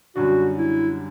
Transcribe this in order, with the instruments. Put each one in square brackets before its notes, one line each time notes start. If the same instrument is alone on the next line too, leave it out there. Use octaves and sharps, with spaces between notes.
[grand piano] F#2 D3 G3 D4 [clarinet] F#4
[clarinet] E4